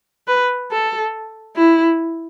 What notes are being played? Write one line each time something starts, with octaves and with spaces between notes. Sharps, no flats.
B4
A4
E4